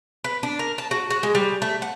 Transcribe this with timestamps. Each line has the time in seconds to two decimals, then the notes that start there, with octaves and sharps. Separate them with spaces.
0.24 B4
0.43 D4
0.59 A#4
0.78 A5
0.91 F#4
1.10 F#4
1.23 G#3
1.35 G3
1.62 A3
1.82 F#5